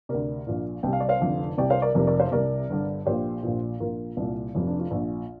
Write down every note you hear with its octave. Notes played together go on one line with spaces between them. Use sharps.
D2 C3 A#4 D5
A#1 A#2
C2 C3 G5
F5
D5
C5 F5
F1 F2 D3
C2 C3 D5 G5
C5 F5
A#4 D5
F1 F2 C3 A#4 D5
A#4 D5
C5 F5
C2 C3 A#4 D5
G1 G2 D3
A#1 A#2 G4 C5
A#1 A#2
A#1 A#2 F4 A#4
C2 A#2
F1 F2 C3 F4
D4
F4
A#1 A#2